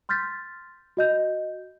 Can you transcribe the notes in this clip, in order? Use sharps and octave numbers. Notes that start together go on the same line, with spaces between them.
C6 F6 G6 A6 B6
F#4 D#5 G6